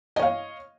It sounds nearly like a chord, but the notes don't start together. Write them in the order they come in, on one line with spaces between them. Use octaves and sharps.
D#5 C#5 F5